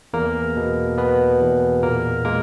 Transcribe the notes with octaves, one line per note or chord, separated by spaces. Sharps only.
E2 A#3 A#4
B2
B2 B3 B4
E2
A#2 A#3 A#4
G#3 A#3 A#4